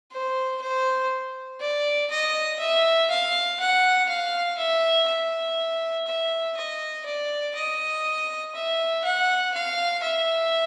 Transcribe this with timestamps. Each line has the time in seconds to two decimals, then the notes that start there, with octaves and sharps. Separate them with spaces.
0.12 C5
0.61 C5
1.60 D5
2.11 D#5
2.59 E5
3.10 F5
3.60 F#5
4.09 F5
4.58 E5
5.08 E5
6.07 E5
6.57 D#5
7.05 D5
7.55 D#5
8.55 E5
9.04 F#5
9.54 F5
10.03 E5